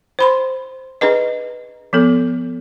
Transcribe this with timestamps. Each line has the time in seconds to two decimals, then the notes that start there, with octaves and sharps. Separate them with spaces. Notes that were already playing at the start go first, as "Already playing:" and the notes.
0.19 C5 B5 C6
1.01 D4 G#4 B4 D#5
1.93 F3 B3 A4